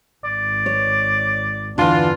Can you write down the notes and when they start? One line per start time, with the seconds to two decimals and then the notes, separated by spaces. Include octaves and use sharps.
0.24 G#1 D5
0.66 C#5
1.78 E2 G2 D3 E3 D4 F4